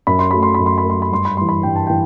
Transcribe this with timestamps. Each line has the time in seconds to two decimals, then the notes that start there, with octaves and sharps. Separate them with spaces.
0.07 F#2 B5
0.19 C6
0.31 F#3 A3 B5
0.43 C6
0.54 F#2 B5
0.66 C6
0.78 B5
0.85 F#3 A3 C6
1.02 B5
1.11 G2 C6
1.25 B5
1.37 E3 G3 C6
1.49 B5
1.63 G2 G5
1.76 A5
1.87 E3 G5